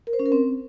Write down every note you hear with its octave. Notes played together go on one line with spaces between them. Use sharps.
A#4
C5
C#4
A#4
C4